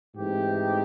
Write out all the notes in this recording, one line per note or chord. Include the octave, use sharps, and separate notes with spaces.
G#2 E3 A3 C4 D#4 G4